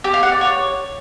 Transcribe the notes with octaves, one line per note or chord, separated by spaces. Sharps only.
G4
F5
F#5
D5
C#5